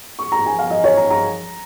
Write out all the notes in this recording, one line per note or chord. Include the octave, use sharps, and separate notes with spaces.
C#6
A#5
G#5
F5
D#5
C#5
A#5
A#5